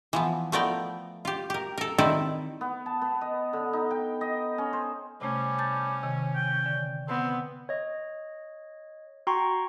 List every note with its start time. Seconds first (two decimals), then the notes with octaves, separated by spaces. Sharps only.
0.13 E3 F3 B3
0.52 F3 A3 B3 A#4 D5 G5
1.25 F4 G4
1.50 G4 A#4
1.78 A4 A#4
1.98 D#3 C4 D#4 E4 A4 D5
2.61 B3
2.86 A5
3.01 B3
3.21 D#5
3.53 D3
3.73 D#4
3.91 G5
4.21 D#5
4.58 C#4
4.73 C5
5.21 C3 G3 A3 C#4
5.58 A5 G6 A6
6.03 C3 D#3
6.35 G5
6.66 D3
7.09 B3 C4
7.69 C#5 D#5
9.27 F#4 G5 A#5 C6 C#6